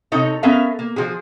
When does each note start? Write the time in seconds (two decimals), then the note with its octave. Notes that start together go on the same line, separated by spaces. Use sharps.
0.12 C3 D#4 A4 C#5
0.43 B3 C#4 A4 A#4 E5 F5
0.79 A#3
0.96 F3 F#4 G#4